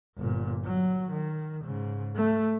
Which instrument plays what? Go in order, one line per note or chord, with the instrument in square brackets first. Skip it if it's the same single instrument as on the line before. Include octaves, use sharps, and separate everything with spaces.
[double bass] G1 A#2
F#3
D#3
G#2 C#3
A3